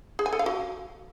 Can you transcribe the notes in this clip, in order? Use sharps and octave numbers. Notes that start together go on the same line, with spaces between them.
G#4
G#5
A4
F5
F#4